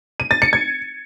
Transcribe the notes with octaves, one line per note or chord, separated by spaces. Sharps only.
D#7
A6
C#7
G#6